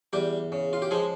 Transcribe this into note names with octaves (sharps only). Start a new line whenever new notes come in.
E2 G3 G4
C#3
F4
G4
F3 G#3 G#4